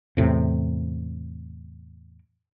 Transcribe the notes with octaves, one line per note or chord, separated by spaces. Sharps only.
E2 A2 C3